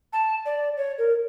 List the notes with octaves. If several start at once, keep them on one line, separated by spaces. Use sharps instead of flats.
A5
D5
C#5
A#4